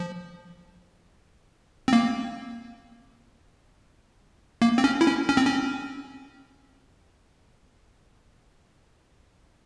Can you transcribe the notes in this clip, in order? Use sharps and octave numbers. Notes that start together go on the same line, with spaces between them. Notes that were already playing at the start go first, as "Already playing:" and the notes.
Already playing: F3
C4
A#3
A#3
C4
C#4
E4
C#4
C#4
C4
C#4